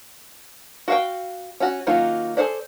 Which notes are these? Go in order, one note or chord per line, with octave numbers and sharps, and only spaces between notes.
F#4 F5 G5
C#4 F#4
D#3 F#3 A#3 C#4 F4
G#4 A4 C5 D5